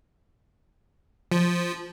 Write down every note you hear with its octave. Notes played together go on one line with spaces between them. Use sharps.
F3